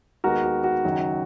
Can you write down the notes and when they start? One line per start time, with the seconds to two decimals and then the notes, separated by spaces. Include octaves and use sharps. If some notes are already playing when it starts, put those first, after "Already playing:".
0.24 D#2 D#3 G#3 B3 F#4 A#4
0.44 F#4
0.64 F#4
0.84 F#1 F#2 D#3 F#3